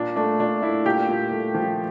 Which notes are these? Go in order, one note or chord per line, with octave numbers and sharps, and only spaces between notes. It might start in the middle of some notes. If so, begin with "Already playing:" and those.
Already playing: A#2 D4
A3 D4
A#2 D4
A3 E4
A#2 G4
A#2
A3
F3